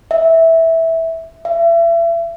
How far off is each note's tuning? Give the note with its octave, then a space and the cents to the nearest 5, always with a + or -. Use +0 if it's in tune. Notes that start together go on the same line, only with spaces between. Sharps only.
E5 -10
E5 +35